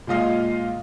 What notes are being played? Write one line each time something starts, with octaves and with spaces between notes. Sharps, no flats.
A#2 G#3 F4 D#5 F5